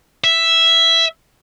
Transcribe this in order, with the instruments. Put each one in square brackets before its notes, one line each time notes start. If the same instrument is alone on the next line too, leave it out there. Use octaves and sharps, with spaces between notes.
[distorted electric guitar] E5